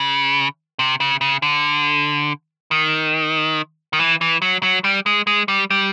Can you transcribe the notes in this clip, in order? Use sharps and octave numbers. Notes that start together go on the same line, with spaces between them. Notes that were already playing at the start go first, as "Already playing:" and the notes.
Already playing: C#3
C3
C#3
C#3
D3
D#3
D#3
E3
E3
F#3
F#3
G3
G#3
G#3
G3
G3